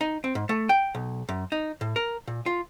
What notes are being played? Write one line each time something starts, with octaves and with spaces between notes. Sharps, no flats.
D#4
C4
G#2
A3
G5
B1
F#2
D#4
A2
A#4
A#2
F4